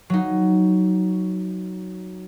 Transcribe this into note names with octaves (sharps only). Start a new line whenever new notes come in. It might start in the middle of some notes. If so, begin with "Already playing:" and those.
F#3 D#4